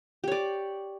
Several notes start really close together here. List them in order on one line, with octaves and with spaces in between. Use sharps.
G4 C#5 D5